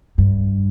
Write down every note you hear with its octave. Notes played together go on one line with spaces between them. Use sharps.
G2